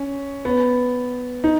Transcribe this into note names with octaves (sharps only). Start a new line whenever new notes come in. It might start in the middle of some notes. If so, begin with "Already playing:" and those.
Already playing: C#4
B3
D#4